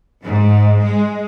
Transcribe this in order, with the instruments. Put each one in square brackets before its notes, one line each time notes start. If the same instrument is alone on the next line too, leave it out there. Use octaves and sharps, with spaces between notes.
[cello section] G#2
G#3